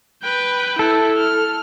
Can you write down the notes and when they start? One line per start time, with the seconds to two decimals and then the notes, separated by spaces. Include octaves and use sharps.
0.23 B4 G5
0.79 E4 A4
1.17 F6